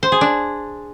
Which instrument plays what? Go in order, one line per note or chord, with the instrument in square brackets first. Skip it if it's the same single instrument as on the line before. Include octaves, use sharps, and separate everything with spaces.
[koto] C5
G#4
D4